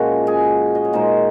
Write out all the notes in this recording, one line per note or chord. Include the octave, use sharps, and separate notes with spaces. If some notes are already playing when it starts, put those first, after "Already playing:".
Already playing: A#2 F3 G#3 C#4 F#4
G#4
D#5
C#5
A#2 G#3 D#4 C5